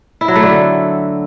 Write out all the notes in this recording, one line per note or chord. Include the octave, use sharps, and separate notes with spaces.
E4
F#3
A3
D3